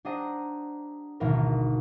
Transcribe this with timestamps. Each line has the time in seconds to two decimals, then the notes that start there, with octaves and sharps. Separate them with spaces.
0.05 D4 G4 C5 D#5 F#5 A#5
1.20 G#1 D2 B2 E3 B3 A#4